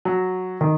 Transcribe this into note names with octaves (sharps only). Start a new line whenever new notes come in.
F#3
D#3